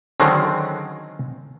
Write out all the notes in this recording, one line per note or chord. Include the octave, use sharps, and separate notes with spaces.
D3 D#3 F#3 G#3 C4 C#4